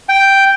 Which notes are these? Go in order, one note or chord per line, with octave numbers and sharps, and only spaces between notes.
G5